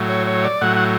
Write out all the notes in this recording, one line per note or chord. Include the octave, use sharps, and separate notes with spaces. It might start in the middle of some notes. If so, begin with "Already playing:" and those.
Already playing: A2 F#3
C#5
C#5
D5
A2 F#3 F#5
F#5